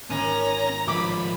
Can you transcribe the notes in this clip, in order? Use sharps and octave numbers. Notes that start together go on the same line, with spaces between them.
G#1 C#4 G#5 A#5
F3 G#3 B5 D6